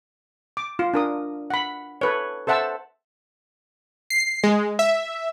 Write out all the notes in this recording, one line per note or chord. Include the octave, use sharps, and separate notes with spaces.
D6
F4
D4 A#4 D#6
F#5 B5
A4 B4 C#5
A4 C5 E5 F#5 A5 E6
C7
G#3
E5